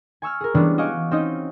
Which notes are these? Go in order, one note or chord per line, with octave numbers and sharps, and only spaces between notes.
G#5 C#6 E6 F6
G#4 A#4
E3 G3 G#3 B3 C#4 D4
F#4 D#5 F5 G#5 C#6 D6
C4 C#4 D#4 D#5